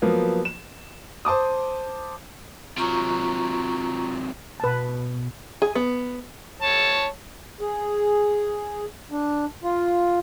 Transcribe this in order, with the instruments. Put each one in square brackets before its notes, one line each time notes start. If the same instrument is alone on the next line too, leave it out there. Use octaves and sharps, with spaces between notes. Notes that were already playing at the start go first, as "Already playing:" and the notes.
[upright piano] F3 F#3 A#3 B3
E7
C5 A5 D6 D#6
[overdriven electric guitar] C3 F#3 [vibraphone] F4 A#5 C#6
[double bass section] B2 [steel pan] B4 A5
[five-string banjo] G#4
B3
[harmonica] C#5 A5
[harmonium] G#4
D4
F4